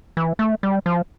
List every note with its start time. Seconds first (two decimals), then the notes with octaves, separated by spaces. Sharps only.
0.17 E3
0.39 A3
0.63 G3
0.86 F3